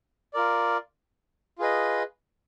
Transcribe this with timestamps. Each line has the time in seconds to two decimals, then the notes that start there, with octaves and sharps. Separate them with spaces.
0.34 F4 A#4 D5
1.59 F4 G#4 B4 D#5